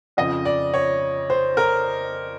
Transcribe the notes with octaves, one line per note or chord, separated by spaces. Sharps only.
F2 C#3 F3 D#5
D5
C#5
C5
A#4